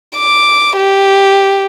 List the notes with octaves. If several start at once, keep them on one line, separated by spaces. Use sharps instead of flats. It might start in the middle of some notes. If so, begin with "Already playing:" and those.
D6
G4